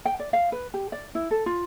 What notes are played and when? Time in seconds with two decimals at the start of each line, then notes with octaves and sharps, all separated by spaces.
0.05 G5
0.20 D5
0.33 F5
0.52 B4
0.74 G4
0.92 D5
1.15 E4
1.31 A4
1.46 F4